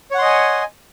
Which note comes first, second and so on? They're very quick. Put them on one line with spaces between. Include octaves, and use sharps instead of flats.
C#5 F#5 C6 D#5 G#5